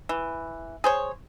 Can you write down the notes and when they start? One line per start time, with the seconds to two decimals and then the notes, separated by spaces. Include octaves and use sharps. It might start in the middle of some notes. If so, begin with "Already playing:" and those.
0.09 E3
0.84 G#4 C5 C#5